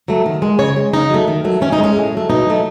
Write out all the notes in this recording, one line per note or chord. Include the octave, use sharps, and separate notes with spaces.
F#3 A3
D#3
G#3
C#3 C#5
G#3
C#3 D#4
F#3 A3
D#3
F#3 A3
D#3 C#4
D#4
G#3
C#4
A2
F#3 A3
B2 D#4
F#3 A3